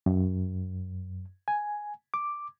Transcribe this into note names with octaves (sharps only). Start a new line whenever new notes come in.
F#2
G#5
D6